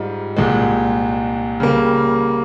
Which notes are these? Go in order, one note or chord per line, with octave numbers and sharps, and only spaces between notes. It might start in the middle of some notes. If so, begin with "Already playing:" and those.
Already playing: G#2 G3 F4
C2 A#2 G#3
C#3 G3 A#3